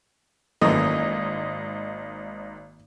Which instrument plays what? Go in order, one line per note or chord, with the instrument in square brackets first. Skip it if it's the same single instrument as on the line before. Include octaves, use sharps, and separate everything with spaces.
[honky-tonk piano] G#1 D#5 [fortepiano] F#2 E3 A3 [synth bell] D#3 A#3 C6